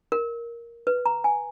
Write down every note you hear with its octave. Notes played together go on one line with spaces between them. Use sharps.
A#4
B4
A#5
G#5